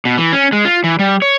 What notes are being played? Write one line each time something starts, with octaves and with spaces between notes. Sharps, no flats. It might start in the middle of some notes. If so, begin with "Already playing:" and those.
B2
E3
C#4
G#3
F4
E3
G3
C#5